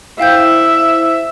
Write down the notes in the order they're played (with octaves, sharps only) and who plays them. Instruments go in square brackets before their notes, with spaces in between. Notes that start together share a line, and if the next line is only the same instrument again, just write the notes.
[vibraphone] E4 C5 [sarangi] E5 [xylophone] F5 G5 G6